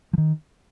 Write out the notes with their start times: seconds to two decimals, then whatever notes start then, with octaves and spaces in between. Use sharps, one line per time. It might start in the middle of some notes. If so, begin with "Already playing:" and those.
0.13 F3
0.18 D#3